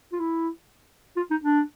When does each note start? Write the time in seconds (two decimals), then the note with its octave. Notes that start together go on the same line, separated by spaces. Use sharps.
0.12 F4
0.19 E4
1.16 F4
1.30 D#4
1.44 D4